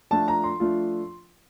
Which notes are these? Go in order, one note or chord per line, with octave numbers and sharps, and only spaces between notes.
F3 A3 D4 F4 A5
A#5
C6
F3 A3 D4 F4